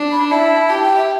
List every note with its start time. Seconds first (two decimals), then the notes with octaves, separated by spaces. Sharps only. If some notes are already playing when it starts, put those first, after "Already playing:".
Already playing: D4
0.12 B5
0.30 E4 A5
0.69 G4 A5
0.82 G5
0.97 E5